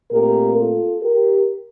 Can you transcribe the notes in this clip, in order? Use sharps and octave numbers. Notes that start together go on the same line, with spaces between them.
A#2 A3 C4 G4 A#4
F4 A4
G4 A#4